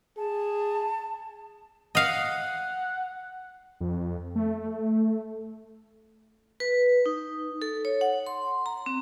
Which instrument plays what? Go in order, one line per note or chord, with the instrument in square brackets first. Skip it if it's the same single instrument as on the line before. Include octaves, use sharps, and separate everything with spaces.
[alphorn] G#4 [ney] A5
[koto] D#5 F5 [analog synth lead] F#5
[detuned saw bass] F2
A3
[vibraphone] B4
D#4
A4
C#5
F#5
C6
A#5
C4